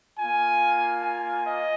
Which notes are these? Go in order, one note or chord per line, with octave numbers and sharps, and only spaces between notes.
A#3 F4 G#5
G#5
D#5